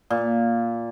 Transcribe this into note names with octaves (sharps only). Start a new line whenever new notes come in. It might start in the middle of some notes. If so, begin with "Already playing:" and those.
A#2